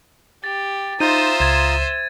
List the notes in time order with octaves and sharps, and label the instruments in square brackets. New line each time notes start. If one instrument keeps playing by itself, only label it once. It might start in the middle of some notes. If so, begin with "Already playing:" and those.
[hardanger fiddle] G4 [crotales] A6
[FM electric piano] D#4 G6 [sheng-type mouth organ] F4 A#5 D#6 [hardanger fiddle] C5 E5 [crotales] D#7
[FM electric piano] C#2 [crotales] G#6 A6